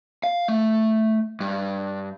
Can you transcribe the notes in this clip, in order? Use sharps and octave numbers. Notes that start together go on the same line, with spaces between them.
F5
A3
G2